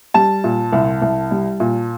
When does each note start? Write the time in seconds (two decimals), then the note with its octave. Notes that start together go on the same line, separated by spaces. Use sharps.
0.14 G3 A5
0.44 A#2
0.72 C2
1.02 C2
1.31 G3
1.60 A#2